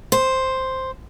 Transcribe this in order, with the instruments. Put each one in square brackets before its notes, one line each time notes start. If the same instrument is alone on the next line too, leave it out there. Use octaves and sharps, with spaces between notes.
[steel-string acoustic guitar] C5